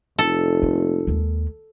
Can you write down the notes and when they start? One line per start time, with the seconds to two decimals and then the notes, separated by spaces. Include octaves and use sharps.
0.19 F1 A4
0.62 A#3
1.07 D#2 G#3